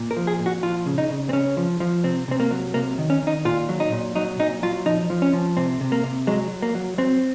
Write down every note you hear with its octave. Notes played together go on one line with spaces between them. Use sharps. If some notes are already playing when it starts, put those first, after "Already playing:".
Already playing: A#2
A#4
F3
G#4
A#2
F#4
F3 F4
C#3
D#4
C#3
C4
C#3 C#4
F3
F3
C3 C4
C3 C4
A#3
F#3
C3 A#3
D#3
C#4
D#3 D#4
A#2 F4
F#3
D#4
A#2
F#3 D#4
A#2 D#4
F#3 F4
F3 D#4
F3
C#4
F3
C3 C4
C3
A#3
C3
F#3 G#3
F#3
A#3
F#3
F#3 C4